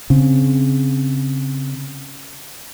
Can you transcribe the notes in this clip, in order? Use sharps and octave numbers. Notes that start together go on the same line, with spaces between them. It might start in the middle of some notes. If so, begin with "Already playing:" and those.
C#3 C4